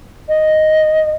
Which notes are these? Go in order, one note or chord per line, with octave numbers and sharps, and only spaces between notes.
D#5